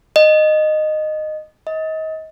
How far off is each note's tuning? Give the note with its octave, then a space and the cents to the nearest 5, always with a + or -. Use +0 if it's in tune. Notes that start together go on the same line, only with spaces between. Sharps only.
D#5 -15
D#5 +30